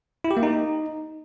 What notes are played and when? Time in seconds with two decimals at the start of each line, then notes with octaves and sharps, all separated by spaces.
0.24 E4
0.31 G4
0.37 A#3
0.43 D#4